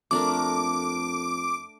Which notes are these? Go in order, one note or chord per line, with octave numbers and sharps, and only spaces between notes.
F2 A3 D4 A#4 D6